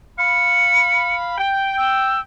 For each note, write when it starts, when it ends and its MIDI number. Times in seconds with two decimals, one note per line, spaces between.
0.18 1.36 77
0.18 1.36 83
0.18 1.16 97
1.38 2.18 79
1.78 2.20 88